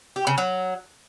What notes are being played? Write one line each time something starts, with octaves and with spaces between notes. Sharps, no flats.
G4
C#3
F#3